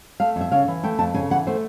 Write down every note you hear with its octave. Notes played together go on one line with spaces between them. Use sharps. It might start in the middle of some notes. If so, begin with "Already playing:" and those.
A3 F5
F2
E5
C#3 F5
E3
A3 G5
F2 A5
C#3 G#5
E3 F#5
A3 C5